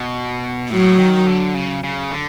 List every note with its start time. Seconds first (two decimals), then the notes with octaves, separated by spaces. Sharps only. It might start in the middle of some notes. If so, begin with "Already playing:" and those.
Already playing: B2
0.70 A2 F#3
0.99 D#3
1.27 D3
1.54 C#3
1.84 C#3
2.11 D3